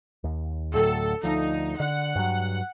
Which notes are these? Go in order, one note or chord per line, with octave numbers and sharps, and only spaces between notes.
D#2
D2 A2 F#3 A4
D2 F3 D#4
D3 F#5
G2 F#3